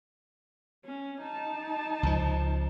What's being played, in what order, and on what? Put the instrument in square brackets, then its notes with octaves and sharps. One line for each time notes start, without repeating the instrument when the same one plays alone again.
[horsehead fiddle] C#4
D#4 A5
[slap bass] C#2 F3